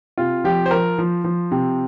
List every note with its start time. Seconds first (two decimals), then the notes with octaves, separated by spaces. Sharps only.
0.18 C3 F4
0.44 F3 G4
0.66 C5
0.71 F3 A#4
0.98 F3
1.24 F3
1.51 C3